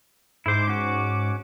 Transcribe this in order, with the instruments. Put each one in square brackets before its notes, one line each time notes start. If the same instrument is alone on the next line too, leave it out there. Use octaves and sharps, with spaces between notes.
[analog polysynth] G#2 D6 [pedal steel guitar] E4 C5
[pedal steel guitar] C#4 F#4